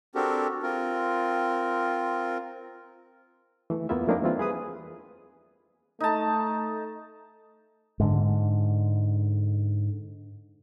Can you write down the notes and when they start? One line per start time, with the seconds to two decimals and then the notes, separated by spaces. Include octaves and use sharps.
0.15 C4 D4 F#4 G4 A4 A#4
0.63 C4 F4 A#4
3.70 E3 A3
3.89 E2 A#3 B3 E4 F4 E5
4.07 F3 A3 A#3 C4 D4 D#4
4.22 E3 G3 C4 E4 F4
4.39 G#4 B4 D#6
6.00 A3 D#4 A5
8.00 G#2 D3